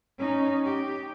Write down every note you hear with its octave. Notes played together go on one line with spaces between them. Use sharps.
C#4 D#4
G4